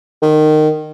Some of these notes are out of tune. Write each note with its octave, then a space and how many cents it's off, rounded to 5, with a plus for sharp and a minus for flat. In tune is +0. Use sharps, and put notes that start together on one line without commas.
D#3 -20